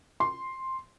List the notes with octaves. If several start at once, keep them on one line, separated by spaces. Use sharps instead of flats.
C6